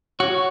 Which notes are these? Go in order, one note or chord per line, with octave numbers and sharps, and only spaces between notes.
F#4 C#5